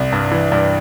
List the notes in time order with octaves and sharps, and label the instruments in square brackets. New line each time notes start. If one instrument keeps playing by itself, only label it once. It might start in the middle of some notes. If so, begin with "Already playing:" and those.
Already playing: [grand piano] C2
G2
E3
G2